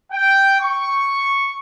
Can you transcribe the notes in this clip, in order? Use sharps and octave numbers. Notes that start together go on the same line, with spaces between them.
G5
C#6